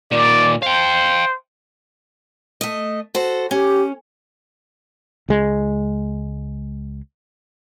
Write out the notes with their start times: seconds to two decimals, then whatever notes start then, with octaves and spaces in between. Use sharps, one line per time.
0.11 A#2 D#3 D5
0.62 C5 F5 G5
2.61 A3 D#5
3.15 F#4 A4 C5
3.51 C#4 G4
5.29 C#2 G#3